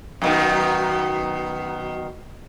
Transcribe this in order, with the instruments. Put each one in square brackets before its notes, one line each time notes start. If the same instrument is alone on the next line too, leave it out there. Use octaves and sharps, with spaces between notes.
[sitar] F#2 B2 D#3